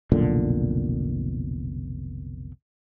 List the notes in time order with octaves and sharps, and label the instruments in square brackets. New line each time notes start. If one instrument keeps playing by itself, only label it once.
[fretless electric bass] F1 B1 A#2 D3